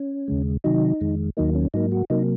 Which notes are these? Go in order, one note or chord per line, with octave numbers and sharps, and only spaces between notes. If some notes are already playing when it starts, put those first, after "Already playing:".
Already playing: C#4
D#2 C#3 G#3
C3 D#3 F#3 D#4
F2 D#3 G#3
D#2 D#3 F#3 A#3 D#4
C#4
G#2 F#3 A#3 D#4
F#4
C3 F#3 A#3 D#4